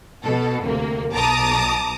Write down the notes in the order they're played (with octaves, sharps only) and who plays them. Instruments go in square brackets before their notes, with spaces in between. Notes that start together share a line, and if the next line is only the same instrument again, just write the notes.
[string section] B2 A4
D2 C3 A#3
B1 B2 A5 A#5 D6 D#6